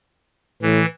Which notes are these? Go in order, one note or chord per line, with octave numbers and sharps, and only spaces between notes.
A2 E3